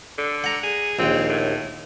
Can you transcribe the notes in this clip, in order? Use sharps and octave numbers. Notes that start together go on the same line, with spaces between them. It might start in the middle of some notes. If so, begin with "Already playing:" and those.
D3
F#5 A#5
G#4
A#1 D#2 C4
A2